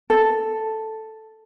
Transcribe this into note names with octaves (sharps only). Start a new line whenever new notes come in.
A4